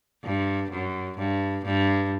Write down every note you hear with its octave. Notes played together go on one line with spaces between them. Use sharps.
G2
F#2
G2
G2